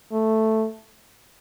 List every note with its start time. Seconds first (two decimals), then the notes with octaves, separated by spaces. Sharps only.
0.12 A3